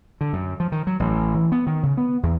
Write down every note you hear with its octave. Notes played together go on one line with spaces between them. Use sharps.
D3
F#2
F3
D#3
F#3
A1
E3
B3
D#3
C#3
B3
E2